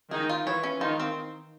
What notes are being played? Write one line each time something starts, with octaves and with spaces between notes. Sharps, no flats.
D#3 D#4 G#4
F4
E3 E4 C#5
C#4
D#3 D#4 F4
C4